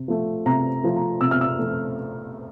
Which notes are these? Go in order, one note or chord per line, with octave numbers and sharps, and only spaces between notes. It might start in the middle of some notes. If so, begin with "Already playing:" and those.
Already playing: C3
F3 A3
C3 A#5
F3 A3
A#5
C3 E6
F6
E6
F3 A3